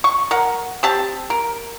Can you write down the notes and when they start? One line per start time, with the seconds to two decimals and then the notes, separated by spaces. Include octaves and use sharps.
0.04 C#6
0.31 A#4 F#5
0.83 C4 G4 A5
1.30 A#4